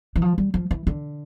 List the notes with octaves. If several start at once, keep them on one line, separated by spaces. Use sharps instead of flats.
E3
F3
G3
F3
E3
D3